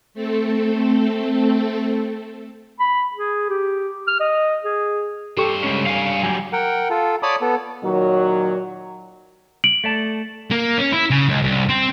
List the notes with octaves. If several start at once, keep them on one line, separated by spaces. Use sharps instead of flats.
A3 C4 A4
B5
G#4
G4
F6
D#5
G#4
G2 G4 A4 C5 C#6
G#3 C#4
F5 G#5
F#3 G4 G#5
A#4 F#5 G5
F4 A4
C#5 D5 A5 B5 D6 D#6
B3 A4
A#2 D#3 F#3
D7 F#7
A3 D5 A5
A#3
C#4
E4
C#3
C#2
C2
C4